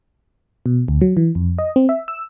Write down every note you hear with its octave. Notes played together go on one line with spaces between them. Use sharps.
B2
D2
F#3
E3
F2
D#5
C4
E5
E6